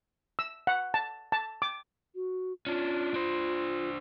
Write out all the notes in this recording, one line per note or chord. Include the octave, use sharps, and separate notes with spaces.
E6
F#5
A5
A5
D6
F#4
C#4 D4 F4
D4 C5